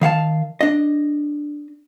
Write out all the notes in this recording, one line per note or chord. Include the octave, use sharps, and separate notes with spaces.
D#3 F5 F#5 A5
D4 D#5